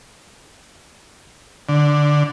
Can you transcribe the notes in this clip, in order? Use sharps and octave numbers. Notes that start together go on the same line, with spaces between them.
D3